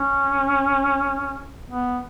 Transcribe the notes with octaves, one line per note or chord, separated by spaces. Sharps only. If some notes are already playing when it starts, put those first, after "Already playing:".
Already playing: C#4
B3